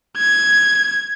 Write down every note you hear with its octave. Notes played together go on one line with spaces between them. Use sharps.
G#6